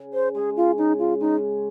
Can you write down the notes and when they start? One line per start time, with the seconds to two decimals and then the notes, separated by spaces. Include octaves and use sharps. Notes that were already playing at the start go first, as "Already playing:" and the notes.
Already playing: C#3
0.13 C5
0.35 G#3 C#4 G#4
0.56 F4
0.78 C#3 D#4
0.99 F4
1.20 G#3 C#4 D#4